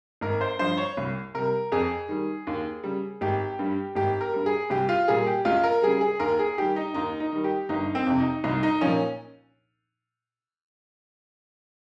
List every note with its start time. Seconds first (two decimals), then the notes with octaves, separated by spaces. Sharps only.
0.21 G#1 A#4
0.41 C5
0.59 G2 F3 C5
0.77 C#5
0.97 C2
1.34 C3 G3 A#4
1.72 F2 G#4
2.08 D#3 G3
2.47 D#2
2.84 C#3 G3
3.21 G#1 G4
3.59 G2 G3
3.95 G#1 G4
4.21 A#4
4.34 G2 G3
4.46 G#4
4.70 C2 G4
4.89 F4
5.08 A#2 G3 G#4
5.27 G4
5.45 C#2 F4
5.63 A#4
5.82 C#3 G3 G#4
6.01 G#4
6.20 D#2 A#4
6.39 G#4
6.57 D#3 G3 G4
6.76 D#4
6.94 D#2 D#4
7.20 D#4
7.32 D#3 G3
7.44 G4
7.69 G1 D#4
7.95 C4
8.06 F2 C3
8.20 D#4
8.44 C2 D#4
8.63 D#4
8.81 A#2 F3 C#4